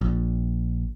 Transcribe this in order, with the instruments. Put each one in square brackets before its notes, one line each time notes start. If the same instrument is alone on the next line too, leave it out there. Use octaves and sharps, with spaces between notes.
[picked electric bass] A#1